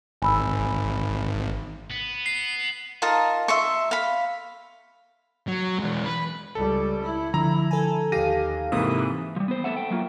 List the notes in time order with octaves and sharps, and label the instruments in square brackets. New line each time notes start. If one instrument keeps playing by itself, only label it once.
[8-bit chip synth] G#1 [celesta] G#5 B5 E6
[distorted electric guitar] B3
[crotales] C7
[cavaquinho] D#4 F4 A#4 A5
E5 C6 C#6
F5 B5
[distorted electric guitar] F#3
E3 G#3
B4
[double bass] C#2 G3 [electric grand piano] A4
[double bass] E4
[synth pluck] D3 F3 [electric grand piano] A#5
[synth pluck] A4 G#5
[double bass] D#2 [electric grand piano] G4 A#6 D#7 [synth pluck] F5
[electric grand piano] G#2 C3 A#3 [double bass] E3 [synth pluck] D#6
[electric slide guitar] F3 G3
B3 C5
A3 B3 E5 F#5
A3 G5
F#3 A#3 F4